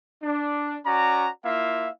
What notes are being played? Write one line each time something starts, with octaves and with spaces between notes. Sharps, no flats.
D4
C#4 F#4 D5 A#5
A#3 E4 F4 E5 F5